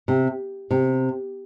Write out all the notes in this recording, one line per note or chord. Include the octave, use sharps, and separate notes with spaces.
C3
C3